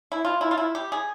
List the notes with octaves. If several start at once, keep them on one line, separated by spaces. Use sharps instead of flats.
E4
F4
E4
F4
E4
G4
G#4